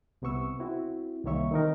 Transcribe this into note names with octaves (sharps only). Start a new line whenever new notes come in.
C2 C3 B3 C#6 E6
C4 E4 F#4
C2 D#3 A#3 C#5 E5 C#6
D#3 C4 D#4 A#4